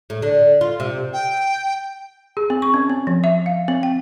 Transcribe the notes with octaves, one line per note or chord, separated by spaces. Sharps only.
A2
D3
F4
C3
G5
G#4
C4
C#6
C#4
C4
F3
E5
F5
C4
G5